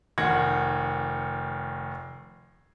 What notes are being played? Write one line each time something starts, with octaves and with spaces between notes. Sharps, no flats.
F1 D#3 F#5 G#6 A#6